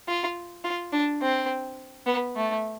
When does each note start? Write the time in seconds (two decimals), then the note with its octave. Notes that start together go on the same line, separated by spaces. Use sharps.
0.08 F4
0.64 F4
0.93 D4
1.22 C4
2.07 B3
2.36 A3